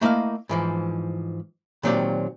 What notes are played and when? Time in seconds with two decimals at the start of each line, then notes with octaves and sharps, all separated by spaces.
0.01 A3 A#3 E4 D#5 F5
0.49 G#2 E3 F3
1.83 A#2 D#3 F#3 C4 G4 D5